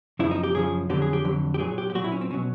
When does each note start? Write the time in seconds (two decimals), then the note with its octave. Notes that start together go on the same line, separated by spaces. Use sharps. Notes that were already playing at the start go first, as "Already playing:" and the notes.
0.19 F#2 C#3 F3 E4
0.31 D#4
0.43 G4
0.54 F#2 C#3 F3 G#4
0.90 F2 D3 F#3 G4
1.02 G#4
1.13 G4
1.25 F2 D3 F#3
1.54 G4
1.59 A#2 F#3 G#4
1.78 G4
1.90 G4
1.95 A#2 F#3 F#4
2.04 E4
2.12 C#4
2.21 C4
2.31 B2 F#3 C#4